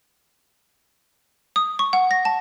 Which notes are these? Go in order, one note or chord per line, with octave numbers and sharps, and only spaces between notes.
D#6
C#6
F#5
A#6
A5